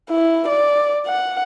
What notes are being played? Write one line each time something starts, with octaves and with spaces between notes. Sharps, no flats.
E4
D5
F#5